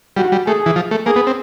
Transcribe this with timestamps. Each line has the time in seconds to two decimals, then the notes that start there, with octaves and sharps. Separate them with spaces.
0.17 G3 F#4
0.32 G3
0.47 A3 G#4
0.66 E3
0.76 F3
0.91 A3
1.06 A#3 G#4
1.16 B3
1.27 C4